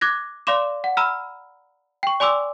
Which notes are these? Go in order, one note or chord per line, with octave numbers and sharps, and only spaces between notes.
D6 F#6 G#6 A#6
D5 F5 C6 D6 E7
F#5
A#5 B5 E6 F6
G5 C#6
D5 G#5 C6 D6 E6